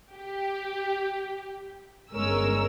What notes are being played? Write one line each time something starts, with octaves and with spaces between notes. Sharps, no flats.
G4
G1 G#3 C#4 A#4 E6